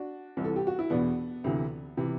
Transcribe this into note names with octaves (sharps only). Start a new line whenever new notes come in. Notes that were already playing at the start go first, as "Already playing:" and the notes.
Already playing: D4 F#4
C2 C3 E3
A4
G4
F#4
E4
E2 B2 B3 D4
D2 C3 E3
C3 E3